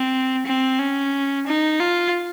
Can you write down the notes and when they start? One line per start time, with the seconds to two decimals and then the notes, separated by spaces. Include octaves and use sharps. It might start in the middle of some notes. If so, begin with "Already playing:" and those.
Already playing: C4
0.46 C4
0.79 C#4
1.47 D#4
1.80 F4